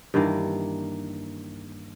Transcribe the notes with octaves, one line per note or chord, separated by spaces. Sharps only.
G2 D#3 E3 A#3